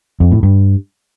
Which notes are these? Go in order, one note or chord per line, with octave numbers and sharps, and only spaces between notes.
F2
A2
G2